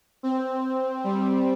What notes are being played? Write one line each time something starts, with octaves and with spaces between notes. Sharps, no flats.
C4
G3